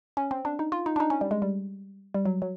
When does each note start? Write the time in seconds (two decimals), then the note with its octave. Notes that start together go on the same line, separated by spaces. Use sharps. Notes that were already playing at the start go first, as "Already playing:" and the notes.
0.17 C#4
0.31 C4
0.45 D4
0.59 D#4
0.72 F4
0.86 D#4
0.96 D4
1.00 D#4
1.10 C#4
1.21 G3
1.31 G#3
1.42 G3
2.14 G3
2.25 F#3
2.42 F#3